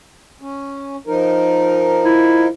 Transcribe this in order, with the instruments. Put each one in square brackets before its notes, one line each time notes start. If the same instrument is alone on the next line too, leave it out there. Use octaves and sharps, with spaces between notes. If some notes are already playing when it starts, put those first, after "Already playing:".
[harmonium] C#4
F3 D#4 A#4
[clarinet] E4